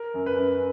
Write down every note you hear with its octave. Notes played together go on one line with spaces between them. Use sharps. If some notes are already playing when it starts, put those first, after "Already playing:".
Already playing: A#4
F#2
B4
F#2